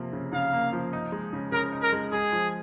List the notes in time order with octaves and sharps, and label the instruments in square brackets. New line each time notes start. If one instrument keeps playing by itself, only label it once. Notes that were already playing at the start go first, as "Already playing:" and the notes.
Already playing: [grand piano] C3 F3 A#3
C#3
[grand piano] C#3 [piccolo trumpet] F5
[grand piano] A#3
F3
D#4
G#3
C#3
[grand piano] C#3 [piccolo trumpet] A#4
[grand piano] D#4
[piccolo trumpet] A#4
[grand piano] G#3
[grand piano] G#3 [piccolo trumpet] G#4
[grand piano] F3